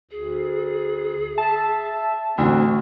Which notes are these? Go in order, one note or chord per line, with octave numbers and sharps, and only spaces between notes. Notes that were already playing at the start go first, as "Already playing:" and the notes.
D2 G#4
E5 A5
A1 D2 C4 D4 F#4